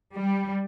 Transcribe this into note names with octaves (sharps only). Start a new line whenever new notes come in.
G3